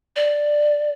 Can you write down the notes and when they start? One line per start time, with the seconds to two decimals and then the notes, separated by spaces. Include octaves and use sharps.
0.16 D5